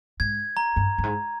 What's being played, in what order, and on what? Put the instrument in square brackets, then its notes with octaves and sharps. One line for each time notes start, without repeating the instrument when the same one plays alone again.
[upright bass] G#2 [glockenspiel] G#6
[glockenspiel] A#5
[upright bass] G2
G2
G#2